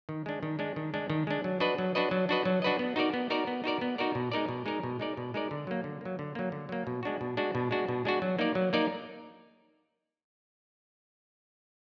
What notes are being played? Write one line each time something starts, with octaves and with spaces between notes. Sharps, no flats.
D#3
G#3 D4
D#3
G#3 D4
D#3
G#3 D4
D#3
G#3 D4
F#3
D4 F#4 B4 D#5
F#3
D4 F#4 B4 D#5
F#3
D4 F#4 B4 D#5
F#3
D4 F#4 B4 D#5
B3
D#4 F#4 A#4 D5
B3
D#4 F#4 A#4 D5
B3
D#4 F#4 A#4 D5
B3
D#4 F#4 A#4 D5
B2
G#3 D#4 A#4 D5
B2
G#3 D#4 A#4 D5
B2
G#3 D#4 A#4 D5
B2
G#3 D#4 A#4 D5
D3
F#3 A#3
D3
F#3 A#3
D3
F#3 A#3
D3
F#3 A#3
B2
G#3 D4 F#4
B2
G#3 D4 F#4
B2
G#3 D4 F#4
B2
G#3 D4 F#4
F#3
A#3 D#4 A#4 D5
F#3
A#3 D#4 A#4 D5